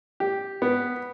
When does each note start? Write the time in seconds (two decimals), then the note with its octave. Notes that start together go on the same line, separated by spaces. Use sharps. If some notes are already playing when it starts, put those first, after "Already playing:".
0.20 G4
0.62 B3